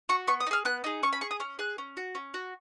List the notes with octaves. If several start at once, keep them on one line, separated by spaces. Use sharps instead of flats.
F#4 C#6
B3 C#6
D#6
D#4
G#4 F6
B3 F#6
D#4 G#4
C#4 C#6
B5
G#4 C#6
D#6
C#4 F6
G#4 F#6
C#4
F#4
C#4
F#4